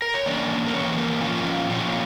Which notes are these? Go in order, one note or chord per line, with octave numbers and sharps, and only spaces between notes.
A#4
C#5
E3 A#3 C#4 D4 D5
A#4
E3 A#3 C#4 C#5
A#3 A#4
A#2 F3 C#4 F4 F5
A#2 F3 C#4 F4